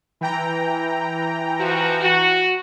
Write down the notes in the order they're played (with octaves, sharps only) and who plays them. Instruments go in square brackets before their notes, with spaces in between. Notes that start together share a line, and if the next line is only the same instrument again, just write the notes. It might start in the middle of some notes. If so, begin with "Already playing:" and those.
[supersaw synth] E3 G5 A#5
[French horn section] F3 F#4
F#4